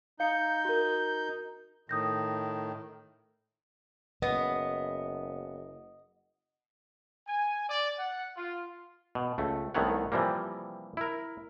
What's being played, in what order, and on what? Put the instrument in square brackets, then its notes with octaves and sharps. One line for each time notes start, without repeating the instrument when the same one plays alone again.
[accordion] D#4 G6 [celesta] F5 C#7
[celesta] F#4 A#4
[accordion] A2 D#3 [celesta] D#6 G6 A#6
[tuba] F#1 [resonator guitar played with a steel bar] B3 [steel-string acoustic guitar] D#5
[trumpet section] G#5
D5
F#5
F4
[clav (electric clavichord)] B2
C#2 A3
C2 D#3 A3 B3 C#5 F#5
C3 E3 F3 G3 A#3
E4 A#4